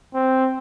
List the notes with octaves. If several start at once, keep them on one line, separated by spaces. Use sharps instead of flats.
C4